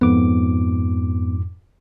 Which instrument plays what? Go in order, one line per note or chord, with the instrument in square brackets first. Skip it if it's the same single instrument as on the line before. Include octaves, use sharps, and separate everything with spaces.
[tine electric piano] F2 G#2 D6 [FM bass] B3